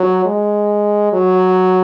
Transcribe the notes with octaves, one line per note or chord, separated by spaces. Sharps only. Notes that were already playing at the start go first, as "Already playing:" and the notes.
Already playing: F#3
G#3
F#3